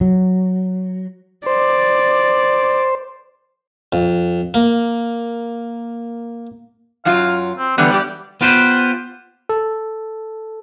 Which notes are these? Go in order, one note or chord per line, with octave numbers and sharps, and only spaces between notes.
F#3
C5 D5
F2
A#3
F#2 F#3 F4 F5
C4
D3 E3 G3 B3
G4 D5
B3 F4 G4 B4 C5
A4